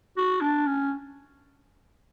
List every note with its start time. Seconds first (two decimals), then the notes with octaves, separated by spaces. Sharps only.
0.17 F#4
0.41 D4
0.66 C#4